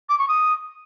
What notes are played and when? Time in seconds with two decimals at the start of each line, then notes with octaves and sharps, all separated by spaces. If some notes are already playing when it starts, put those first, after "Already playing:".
0.09 D6
0.19 C#6
0.28 D#6